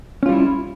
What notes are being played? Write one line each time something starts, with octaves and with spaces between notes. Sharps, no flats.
G3 C#4 E4 F4